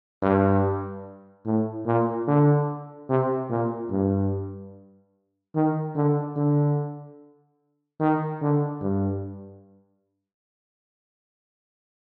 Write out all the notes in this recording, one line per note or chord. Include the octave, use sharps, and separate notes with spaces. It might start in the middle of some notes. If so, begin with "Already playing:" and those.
G2
A2
A#2
D3
C3
A#2
G2
D#3
D3
D3
D#3
D3
G2